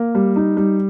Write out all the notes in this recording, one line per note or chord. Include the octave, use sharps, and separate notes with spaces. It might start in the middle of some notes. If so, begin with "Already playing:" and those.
Already playing: A#3
G3
D#4
G3